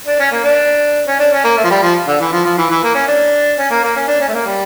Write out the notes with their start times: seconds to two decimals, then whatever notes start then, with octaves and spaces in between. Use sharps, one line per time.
0.07 D4
0.19 C#4
0.32 A#3
0.44 D4
1.07 C#4
1.19 D4
1.33 C#4
1.44 A#3
1.57 A3
1.64 F3
1.70 G3
1.82 F3
2.08 D3
2.20 E3
2.32 F3
2.45 F3
2.58 E3
2.70 E3
2.83 A#3
2.95 C#4
3.08 D4
3.58 C#4
3.71 A#3
3.83 A#3
3.96 C#4
4.07 D4
4.21 C#4
4.28 A3
4.33 A#3
4.46 G3